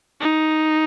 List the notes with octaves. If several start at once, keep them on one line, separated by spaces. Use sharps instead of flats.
D#4